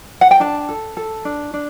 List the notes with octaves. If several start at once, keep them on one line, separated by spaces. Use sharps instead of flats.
F#5
G5
D4 A5
A4
A4
D4
D4